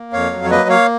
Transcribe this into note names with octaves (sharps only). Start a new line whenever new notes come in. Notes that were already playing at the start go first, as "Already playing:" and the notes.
Already playing: A#3
F2 C#5 F5
F#3
C#5
A#3 B4 D#5
A#3 C#5 F5